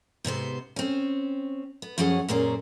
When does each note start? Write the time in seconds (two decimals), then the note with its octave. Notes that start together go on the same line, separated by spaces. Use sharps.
0.24 G#2 C3 B3 C5
0.76 C4 C#4
1.82 B3
1.98 F#2 F3 F#3 C#4 G#4 F#5
2.29 F#2 A#2 A#3 C#4 G#4 C5